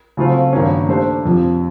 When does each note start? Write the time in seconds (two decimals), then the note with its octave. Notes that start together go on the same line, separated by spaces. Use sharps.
0.17 C#3 F#3 A3 C4 F4
0.53 G2 D#3 F#3 A#3 C#4
0.89 A3 D4 G4 C5
1.25 F2 C3 F3